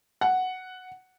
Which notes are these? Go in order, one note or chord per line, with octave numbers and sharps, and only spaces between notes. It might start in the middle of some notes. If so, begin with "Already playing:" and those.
F#5